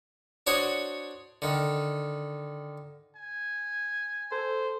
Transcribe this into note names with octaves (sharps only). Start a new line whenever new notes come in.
D4 F#4 C5 C#5 D#5
D3 D#3
G#5
A4 C5